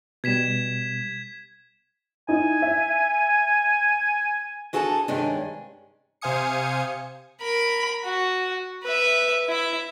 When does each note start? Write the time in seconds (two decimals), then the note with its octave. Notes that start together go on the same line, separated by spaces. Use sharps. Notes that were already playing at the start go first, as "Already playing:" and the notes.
0.24 B2 G3 G#6 B6 E7
2.28 D#4 E4 G#5
2.62 E5
4.73 D4 F#4 G#4 A4 G#5 A5
5.08 G2 C3 D#3 G#3 C#4 D4
6.21 C3 C5 F5 G#5 D#6 C#7
7.41 A#4 B5
8.05 F#4
8.84 B4 E5
9.47 E4 E5